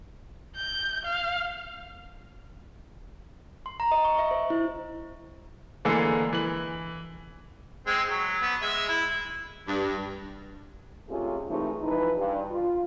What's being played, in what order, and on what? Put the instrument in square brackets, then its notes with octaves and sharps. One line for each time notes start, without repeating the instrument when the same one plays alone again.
[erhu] G6
F5
[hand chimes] C6
A#5
D#5
C#6
E5
C5
E4
[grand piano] D3 E3 G#3 A#3 G#4 A4
E3 F#7
[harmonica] G#3 C4
F#3
B3
G#3 E5
E4
[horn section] G2
[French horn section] C3 G#3 A3 C#4 F4 G#4
C3 E3 G#3 A3 C4 D#4
E3 F3 D#4 E4 B4 D#5
G2
F4